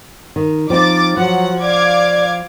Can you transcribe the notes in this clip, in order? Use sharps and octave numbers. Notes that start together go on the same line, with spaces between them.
D#3
F3 C4 D#4 D6 A6
F3 F#3 F#5
D5 F5 D6 G#6